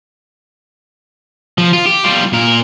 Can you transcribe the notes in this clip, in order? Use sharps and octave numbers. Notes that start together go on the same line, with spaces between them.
F3
F4
G4
G3 F4
A#2 A#4